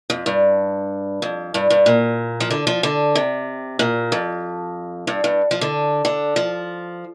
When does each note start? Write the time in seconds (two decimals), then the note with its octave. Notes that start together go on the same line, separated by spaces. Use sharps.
0.10 F2
0.26 G2
1.22 F2
1.54 G2
1.70 G2
1.86 A#2
2.40 F3
2.50 D3
2.67 F3
2.83 D3
3.15 C3
3.79 A#2
4.12 F2
5.07 G2
5.24 G2
5.51 F3
5.61 D3
6.05 D3
6.36 F3